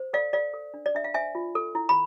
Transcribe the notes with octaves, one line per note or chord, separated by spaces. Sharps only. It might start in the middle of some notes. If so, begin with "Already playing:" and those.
Already playing: C5
A4 D5 F5
A4 D5 F5
A4
D4
D5
D4 E5
F5
C5 E5 G#5
F4
A4
E4
B5